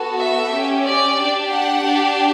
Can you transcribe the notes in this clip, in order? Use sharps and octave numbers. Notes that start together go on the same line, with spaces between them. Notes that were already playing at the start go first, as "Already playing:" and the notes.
Already playing: B3 F#4 A4
E5
C#4 G4
D5
D4 G4
F#5
D4 G4